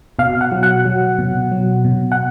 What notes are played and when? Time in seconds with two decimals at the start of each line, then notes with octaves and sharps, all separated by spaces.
0.19 B2 F5
0.41 F#5
0.52 F#3
0.63 F#5
0.85 F#3
1.19 B2
1.52 F#3
1.85 B2
2.12 F#5